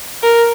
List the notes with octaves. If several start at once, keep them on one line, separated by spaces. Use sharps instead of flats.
A#4